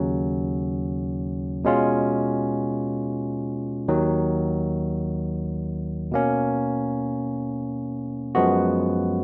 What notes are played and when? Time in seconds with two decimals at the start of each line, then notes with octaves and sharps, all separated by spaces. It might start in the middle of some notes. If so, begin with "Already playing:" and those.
Already playing: D#2 C#3 F#3 C#4
1.64 B2 G#3 C#4 F4
3.88 D#2 D#3 F#3
6.12 B2 A#3 C#4
8.35 F#2 F3 G#3 B3 F#4